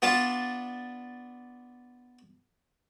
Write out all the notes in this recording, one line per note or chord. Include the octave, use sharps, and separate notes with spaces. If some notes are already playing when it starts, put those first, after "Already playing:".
B3 D4 F4 A5